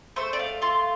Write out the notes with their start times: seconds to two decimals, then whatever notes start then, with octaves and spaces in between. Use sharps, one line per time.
0.16 A3 C5
0.33 D5
0.39 F5
0.62 F4 C6